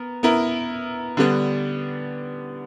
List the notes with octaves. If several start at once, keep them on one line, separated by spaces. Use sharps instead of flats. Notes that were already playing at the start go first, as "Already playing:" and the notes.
Already playing: B3 A#4
B3 E4 A#4
D3 G3 B3 D4